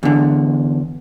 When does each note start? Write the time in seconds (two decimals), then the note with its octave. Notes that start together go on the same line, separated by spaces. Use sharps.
0.03 E2 D3